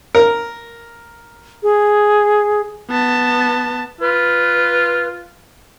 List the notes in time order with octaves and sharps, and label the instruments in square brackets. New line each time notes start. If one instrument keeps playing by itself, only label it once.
[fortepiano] A#4
[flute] G#4
[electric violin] B3 A5
[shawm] F4 [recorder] B4